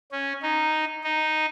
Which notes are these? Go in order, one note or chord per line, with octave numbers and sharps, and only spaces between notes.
C#4
D#4
D#4